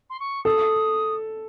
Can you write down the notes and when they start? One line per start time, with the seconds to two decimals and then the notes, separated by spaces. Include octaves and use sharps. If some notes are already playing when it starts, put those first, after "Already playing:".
0.10 C6
0.20 C#6
0.45 A4 D#6